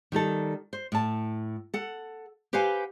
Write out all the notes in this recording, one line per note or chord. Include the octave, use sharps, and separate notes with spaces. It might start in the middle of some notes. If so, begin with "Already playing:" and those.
D#3 G3 D#4 A4
C5
A2 A5
A4 F#5
G4 B4 C5 F5 F#5 G#5